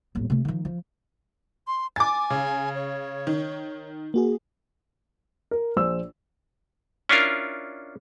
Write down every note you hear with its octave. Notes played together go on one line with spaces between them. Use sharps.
D#1 A1
C3 A3
D#3 F3
F3
C6
G#5 D6 A6
C#3
C#5
D#3
A#3 F#4 G#4
A#4
A#1 C5 E6
C#4 D4 E4 F4 A#4